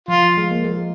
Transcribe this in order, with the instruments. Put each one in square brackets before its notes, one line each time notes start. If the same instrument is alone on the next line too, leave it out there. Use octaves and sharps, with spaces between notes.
[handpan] F3 [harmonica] F4
[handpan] F3
G#3
A#3
G#3